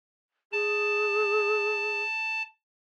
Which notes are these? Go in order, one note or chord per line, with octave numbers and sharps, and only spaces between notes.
G#4 A5